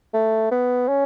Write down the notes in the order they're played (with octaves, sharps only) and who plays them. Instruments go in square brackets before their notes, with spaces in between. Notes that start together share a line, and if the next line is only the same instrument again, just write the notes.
[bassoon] A3
B3
C#4